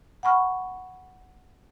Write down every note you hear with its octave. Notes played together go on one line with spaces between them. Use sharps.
F#5 G#5 B5 C#6 F6